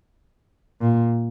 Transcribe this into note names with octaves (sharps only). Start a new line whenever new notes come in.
A#2